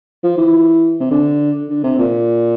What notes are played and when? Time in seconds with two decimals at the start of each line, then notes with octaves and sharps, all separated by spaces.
0.23 F3
0.37 E3
1.00 C3
1.10 D3
1.69 D3
1.84 C3
1.98 A#2